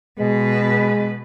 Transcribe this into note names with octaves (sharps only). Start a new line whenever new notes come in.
B2 G#3 B4